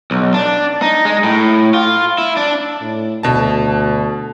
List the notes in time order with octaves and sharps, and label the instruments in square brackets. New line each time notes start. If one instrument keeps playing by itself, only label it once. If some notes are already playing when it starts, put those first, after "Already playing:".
[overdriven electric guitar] B1
D4
D#4
G#3
A2
F4
E4
D4
[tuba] A2
[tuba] D2 [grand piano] B2 A5